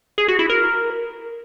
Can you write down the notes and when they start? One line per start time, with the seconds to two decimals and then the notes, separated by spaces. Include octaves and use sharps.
0.18 G#4
0.28 F#4
0.39 E4
0.50 A#4